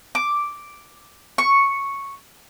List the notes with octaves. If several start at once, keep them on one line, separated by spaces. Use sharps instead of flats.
D6
C#6